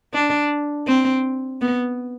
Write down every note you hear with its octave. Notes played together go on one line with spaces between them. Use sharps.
D4
C4
B3